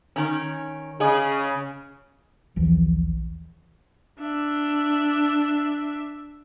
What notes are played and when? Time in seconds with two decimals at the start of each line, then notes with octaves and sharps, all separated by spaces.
0.16 D#3 C#4
1.00 C#3 G#4 D#5
2.56 D#1 A#1 E3 F3
4.19 D4 E5